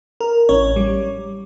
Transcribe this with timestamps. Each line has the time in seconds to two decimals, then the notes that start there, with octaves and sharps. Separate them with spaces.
0.20 A#4
0.49 A1 C#4 C#5
0.76 G3